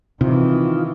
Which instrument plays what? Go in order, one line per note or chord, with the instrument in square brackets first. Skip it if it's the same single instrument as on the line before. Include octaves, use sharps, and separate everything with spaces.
[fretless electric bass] C3 [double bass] D#3 E3 [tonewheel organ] D#4 F4